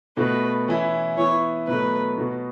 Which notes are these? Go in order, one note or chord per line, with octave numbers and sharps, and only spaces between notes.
B2 A3 F#4 B4
E3 C#4 E4
E3 B3 E4 C#5
B2 F#3 A3 B4
B2 B3 F#4